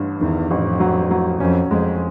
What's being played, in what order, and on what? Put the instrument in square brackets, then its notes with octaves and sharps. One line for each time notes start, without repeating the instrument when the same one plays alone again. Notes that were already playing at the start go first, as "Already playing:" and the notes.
Already playing: [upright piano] A1 G2
[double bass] E2 [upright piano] D#3
[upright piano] A1 [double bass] F2
[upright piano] F#3
F#3
[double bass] F2 [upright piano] C#4
[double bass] F2 [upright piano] G#3